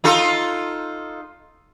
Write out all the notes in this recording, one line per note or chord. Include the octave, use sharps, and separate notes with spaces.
D#4 F4 A4